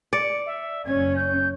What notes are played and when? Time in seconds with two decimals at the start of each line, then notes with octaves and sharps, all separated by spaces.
0.13 D5 C#7
0.46 E5
0.85 F#1 C#4 G#6
1.16 G6